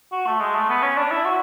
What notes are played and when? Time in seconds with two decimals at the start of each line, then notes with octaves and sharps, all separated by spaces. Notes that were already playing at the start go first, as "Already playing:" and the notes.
0.12 F#4
0.26 A3
0.40 G#3
0.54 A3
0.69 B3
0.82 C#4
0.97 D4
1.11 E4
1.25 F#4